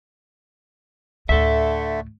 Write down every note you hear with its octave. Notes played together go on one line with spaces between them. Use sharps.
D2 A2 D3 A3 A4 E5